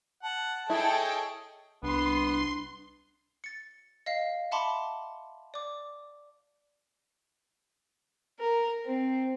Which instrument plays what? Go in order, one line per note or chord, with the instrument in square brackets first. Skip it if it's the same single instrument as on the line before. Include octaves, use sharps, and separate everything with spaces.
[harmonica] F#5 [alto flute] A5
[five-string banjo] E4 [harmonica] G#4 C#5 D#5 [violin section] A4 G5
[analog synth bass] C2 [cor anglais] B3 [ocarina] D4 [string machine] C6
[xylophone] A6 C#7
D#5 F5 C7
E5 F#5 A5 B5 C6 D6
D5 D6
[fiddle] A#4
C4